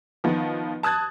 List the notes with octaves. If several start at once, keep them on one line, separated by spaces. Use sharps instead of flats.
D#3 F3 B3
A5 D#6 F#6 G#6 A6